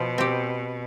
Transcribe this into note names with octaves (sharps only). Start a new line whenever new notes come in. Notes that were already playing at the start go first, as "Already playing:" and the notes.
Already playing: B2 F3
C4 G4